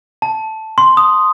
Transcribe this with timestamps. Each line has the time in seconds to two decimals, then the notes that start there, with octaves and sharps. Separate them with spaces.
0.22 A5
0.78 C6
0.97 D#6